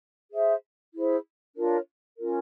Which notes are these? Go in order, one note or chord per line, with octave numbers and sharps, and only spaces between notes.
G#4 C5 E5
E4 G#4 C5
D4 F4 A#4 C#5
C#4 F4 A#4